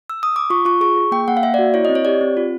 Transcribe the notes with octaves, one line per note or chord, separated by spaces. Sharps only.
E6
D#6
D6
F4 C#6
F4 C#6
G#4 C#6
G#4
A#3 G5
A#3 F#5
F5
A#3 E5
D5
F#4
E4 C#5
D#5
C4
C#5
G4 D5
C4
F4